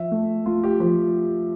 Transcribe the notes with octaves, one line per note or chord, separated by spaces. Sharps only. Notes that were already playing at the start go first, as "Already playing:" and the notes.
Already playing: F3 E5
A3
A3 F4
G4
F3 G4